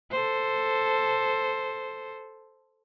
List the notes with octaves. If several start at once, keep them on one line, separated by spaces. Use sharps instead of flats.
A4 C5